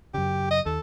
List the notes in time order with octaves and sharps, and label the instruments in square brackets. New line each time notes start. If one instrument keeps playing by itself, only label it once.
[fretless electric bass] F#2 C#3 [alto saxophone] G4
[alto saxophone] D#5
[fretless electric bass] D#2 [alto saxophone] A4